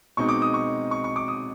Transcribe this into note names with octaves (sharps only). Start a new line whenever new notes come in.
B2 G#3 C4 D#4 C#6
D6
D#6
C#6
C#6
C#6
D6
D#6